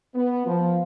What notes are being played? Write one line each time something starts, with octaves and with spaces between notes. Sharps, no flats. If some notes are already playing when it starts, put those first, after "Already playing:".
B3
F3